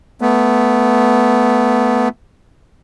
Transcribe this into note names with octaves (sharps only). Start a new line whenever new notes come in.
A3 B3